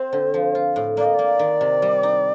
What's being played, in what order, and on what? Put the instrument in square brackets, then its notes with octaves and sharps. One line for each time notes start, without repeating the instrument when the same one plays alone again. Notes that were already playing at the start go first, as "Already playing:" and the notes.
Already playing: [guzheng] C4 [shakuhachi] C5
[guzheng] D3
F3
F4
A2
[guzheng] A#3 [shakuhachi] D5
[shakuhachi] D#5
[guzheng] A#3 [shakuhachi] D5
[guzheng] D#3
C3
G3
D#4